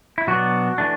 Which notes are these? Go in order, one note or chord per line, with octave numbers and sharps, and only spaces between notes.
E4
B2 F#3 B3 D4 F#4
E3 A3 D4